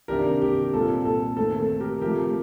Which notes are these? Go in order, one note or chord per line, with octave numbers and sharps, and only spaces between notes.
C3 D#3 A#3 D4 G4 A#4
G4
A#2 G3 C4 A4
A4
D#3 A3 C4 A4
A4
G4 A#4
C3 F3 A3 G4 A#4